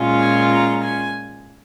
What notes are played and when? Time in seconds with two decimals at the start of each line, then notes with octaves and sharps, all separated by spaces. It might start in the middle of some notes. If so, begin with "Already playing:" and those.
Already playing: A#2 G#3 C#4 F4
0.20 G#5
0.51 A#5
0.84 G#5